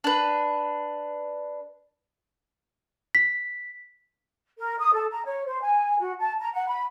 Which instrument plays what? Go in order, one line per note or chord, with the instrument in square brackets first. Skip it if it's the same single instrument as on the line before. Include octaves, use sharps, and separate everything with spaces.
[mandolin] D4 B4
[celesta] B6
[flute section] A#4
D#6
A4
A#5
C#5
C5
G#5
F#4
A5
A#5
F#5
B5